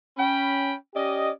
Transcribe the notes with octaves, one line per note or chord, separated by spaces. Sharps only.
C#4 G5 B5
C#4 G4 D5 D#5